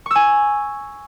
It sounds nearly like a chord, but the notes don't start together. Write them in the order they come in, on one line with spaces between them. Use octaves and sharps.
C#6 E6 G#5